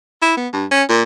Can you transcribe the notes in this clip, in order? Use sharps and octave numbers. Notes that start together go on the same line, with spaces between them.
E4
B3
G2
C#4
A#2